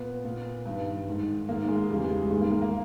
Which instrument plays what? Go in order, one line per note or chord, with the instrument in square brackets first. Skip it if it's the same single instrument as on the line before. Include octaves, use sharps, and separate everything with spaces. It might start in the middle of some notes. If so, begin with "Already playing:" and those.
Already playing: [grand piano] A#2 B3
A#2
G2 D#3
G#2 D#3
G#2 D#3 A#3
G#3
E2 C#3 E3 G3
G#3
G3
G#2 D#3 G#3
A#3
A#3
A#3